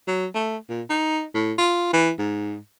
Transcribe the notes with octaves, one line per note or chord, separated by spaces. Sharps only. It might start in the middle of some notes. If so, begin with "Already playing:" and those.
F#3
A3
A#2
D#4
A2
F4
E3
G#2